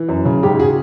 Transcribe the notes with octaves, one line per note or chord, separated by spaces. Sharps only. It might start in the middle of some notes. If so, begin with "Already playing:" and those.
Already playing: E3
F#2
C#3
G#2 G4
F#4 G#4